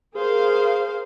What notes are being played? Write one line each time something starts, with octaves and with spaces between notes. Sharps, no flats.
G#4 A#4 C5 F5